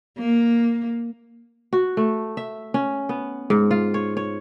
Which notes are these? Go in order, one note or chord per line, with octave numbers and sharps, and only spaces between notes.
A#3
F#4
A3
E5
C#4
B3
G#2
F4
C#5
C#5